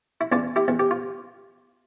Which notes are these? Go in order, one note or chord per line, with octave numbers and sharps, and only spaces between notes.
E4
E2 D4 F4
E4 G4
E2
G4
F4